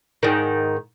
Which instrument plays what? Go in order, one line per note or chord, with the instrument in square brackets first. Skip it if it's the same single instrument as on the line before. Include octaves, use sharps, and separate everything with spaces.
[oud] G#2 D#3